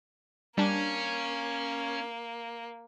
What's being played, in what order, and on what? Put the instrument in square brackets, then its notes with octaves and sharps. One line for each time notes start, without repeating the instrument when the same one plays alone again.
[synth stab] G3 D4 [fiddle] A#3 [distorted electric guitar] C#4